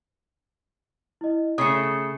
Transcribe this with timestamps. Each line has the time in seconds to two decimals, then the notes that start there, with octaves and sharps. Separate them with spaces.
1.21 E4 D#5
1.58 C#3 A3 D#6 C7 C#7